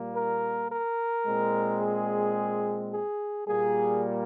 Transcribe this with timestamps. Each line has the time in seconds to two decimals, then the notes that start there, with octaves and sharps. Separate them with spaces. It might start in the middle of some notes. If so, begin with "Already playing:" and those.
Already playing: A#2 G3 A#3
0.14 A#4
0.70 A#4
1.26 A#2 G#3 C4
1.80 G#4
2.92 G#4
3.47 A#2 G3 A#3 G#4